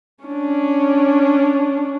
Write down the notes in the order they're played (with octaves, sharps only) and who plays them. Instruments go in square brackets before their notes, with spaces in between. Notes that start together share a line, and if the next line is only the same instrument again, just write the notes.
[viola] C#4 D4